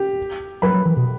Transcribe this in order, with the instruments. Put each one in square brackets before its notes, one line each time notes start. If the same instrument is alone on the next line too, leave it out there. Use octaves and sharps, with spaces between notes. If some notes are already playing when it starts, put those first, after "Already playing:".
Already playing: [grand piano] G4
[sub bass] F#3 [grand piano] B4 B5
[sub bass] F#3
E3
B2